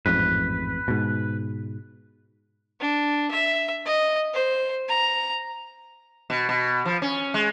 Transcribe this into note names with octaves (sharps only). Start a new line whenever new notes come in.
A1 F2 G#2 B4
G#2 B2
D4
E5
D#5
C5
A#5
B2
B2
F3
C#4
G#3